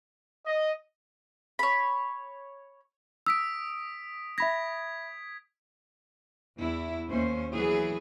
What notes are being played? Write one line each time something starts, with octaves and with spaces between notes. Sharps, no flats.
D#5
C#5 B5
D#6 E6 B6 D7
E5 B5 G#6 A#6 B6
E2 E4
D#2 C#4 C5
E3 F#3 B3 E4 G#4 B4